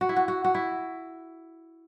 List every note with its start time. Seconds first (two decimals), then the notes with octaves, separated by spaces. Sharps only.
0.01 F#4
0.09 E4
0.16 F#4
0.28 F#4
0.44 F#4
0.55 E4